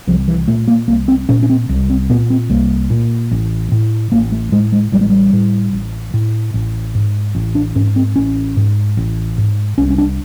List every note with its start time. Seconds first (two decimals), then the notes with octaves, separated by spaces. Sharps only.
0.07 C2 F3
0.28 E3
0.48 A#2 A3
0.68 A#3
0.88 C2 A#3
1.08 C4
1.29 A#2 C#4
1.43 C#4
1.50 C4
1.69 C2
1.90 C4
2.10 A#2 B3
2.30 C4
2.49 C2 A#3
2.90 A#2
3.31 A1
3.72 A2
4.12 A1 A#3
4.32 A3
4.52 A2 G#3
4.72 G#3
4.92 A1 G3
5.01 G#3
5.10 G3
5.33 A2
5.73 A1
6.14 A2
6.54 A1
6.95 G#2
7.35 A1
7.55 D4
7.75 G#2 C#4
7.96 C4
8.16 A1 C#4
8.57 G#2
8.97 A1
9.38 G#2
9.78 C2 C#4
9.90 C#4
9.98 D4